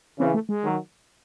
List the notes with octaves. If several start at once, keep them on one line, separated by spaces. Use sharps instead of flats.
C#3 E3 C4
A3
G#3
D#3 F#3